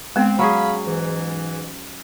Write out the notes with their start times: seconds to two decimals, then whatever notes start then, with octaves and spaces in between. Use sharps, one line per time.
0.16 G#3 B3 C4
0.39 F#3 C#4 G#4 F5 B5
0.85 G#2 E3